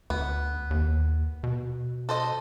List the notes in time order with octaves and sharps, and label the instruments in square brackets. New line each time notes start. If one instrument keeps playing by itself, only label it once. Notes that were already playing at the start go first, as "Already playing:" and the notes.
[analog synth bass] D2 [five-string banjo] B3
[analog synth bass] D#2
B2
[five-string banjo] A4 C5 D#5